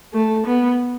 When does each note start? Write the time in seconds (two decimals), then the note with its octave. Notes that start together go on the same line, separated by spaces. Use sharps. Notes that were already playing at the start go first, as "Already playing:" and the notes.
0.14 A3
0.46 B3